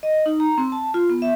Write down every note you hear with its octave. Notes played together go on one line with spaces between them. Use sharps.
D#5
D#4
A#5
C4
A5
F4
B3
E5